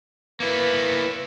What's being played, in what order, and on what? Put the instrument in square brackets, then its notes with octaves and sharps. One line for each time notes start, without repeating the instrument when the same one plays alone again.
[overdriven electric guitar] A#3 E4 [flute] B4